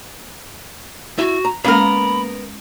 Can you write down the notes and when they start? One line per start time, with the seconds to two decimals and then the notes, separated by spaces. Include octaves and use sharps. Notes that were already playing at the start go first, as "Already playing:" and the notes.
1.18 E4 F#4
1.45 A#5
1.65 G#3 A#3 B3 C#4 A#4 F#5 B5